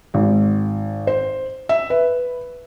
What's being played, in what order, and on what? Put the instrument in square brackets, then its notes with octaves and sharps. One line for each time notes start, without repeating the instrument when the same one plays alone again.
[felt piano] G#1
C5
E5
B4